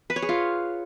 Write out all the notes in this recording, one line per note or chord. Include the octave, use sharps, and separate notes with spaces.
B4
C#5
G#4
F4